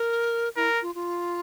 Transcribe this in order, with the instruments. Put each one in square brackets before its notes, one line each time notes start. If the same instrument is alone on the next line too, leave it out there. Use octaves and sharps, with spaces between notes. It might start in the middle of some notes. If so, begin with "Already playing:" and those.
Already playing: [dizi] A#4
[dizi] E4 [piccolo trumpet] A#4
[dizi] F4
F4